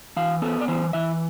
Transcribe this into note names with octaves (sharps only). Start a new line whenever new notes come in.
E3 F5
B3 A4
D5
E3 C5
E3 E5